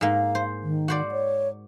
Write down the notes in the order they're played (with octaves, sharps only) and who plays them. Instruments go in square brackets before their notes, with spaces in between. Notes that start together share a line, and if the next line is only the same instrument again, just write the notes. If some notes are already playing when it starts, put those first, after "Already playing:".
[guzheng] G#2 A#3 [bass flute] F5
[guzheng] C5
[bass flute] D#3
[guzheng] F#4 C5 D5
[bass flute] C#5